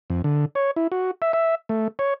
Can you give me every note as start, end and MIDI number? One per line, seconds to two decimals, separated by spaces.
0.10 0.22 41
0.24 0.45 50
0.55 0.71 73
0.76 0.87 64
0.92 1.11 66
1.22 1.33 76
1.33 1.55 76
1.69 1.88 57
1.99 2.14 73